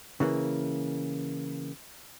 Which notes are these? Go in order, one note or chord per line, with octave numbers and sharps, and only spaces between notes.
C#3 E3 A#3